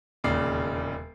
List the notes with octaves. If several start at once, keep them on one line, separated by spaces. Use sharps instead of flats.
E1 D#2 A#2 C#3 D5 C7